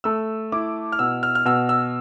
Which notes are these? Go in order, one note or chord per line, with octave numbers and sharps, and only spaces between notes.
A3 E6
E4 D6
F6
B2 E6
F6
F6
B2 E6
E6